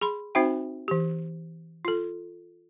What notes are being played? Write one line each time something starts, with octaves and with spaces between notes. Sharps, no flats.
G#4 B5 C6
C4 D#4 F#4 C5 E5 G5
E3 G4
F4 A4